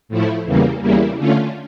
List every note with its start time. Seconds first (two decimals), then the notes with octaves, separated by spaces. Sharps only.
0.09 A2 F3 A3 E4
0.45 E2 C#3 E3 G3 A#3
0.81 E2 C#3 G3 A#3 E4
1.17 D3 A3 C#4 F4